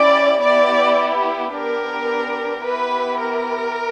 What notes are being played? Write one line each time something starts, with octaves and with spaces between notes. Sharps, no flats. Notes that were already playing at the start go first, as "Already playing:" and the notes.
Already playing: C#4 E4 G4 D5
B3 E4 G4 D5
B3 D4 G4 A#4
B3 E4 G4 B4
A#4